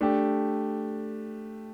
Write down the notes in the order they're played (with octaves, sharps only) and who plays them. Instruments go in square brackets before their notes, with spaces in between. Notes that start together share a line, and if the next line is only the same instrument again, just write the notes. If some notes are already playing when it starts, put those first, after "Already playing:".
[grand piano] A3 D4 G4